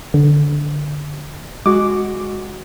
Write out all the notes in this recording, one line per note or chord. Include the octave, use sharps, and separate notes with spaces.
D3
G#3 F#4 D6